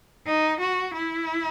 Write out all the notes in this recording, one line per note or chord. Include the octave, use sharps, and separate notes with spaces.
D#4
F#4
E4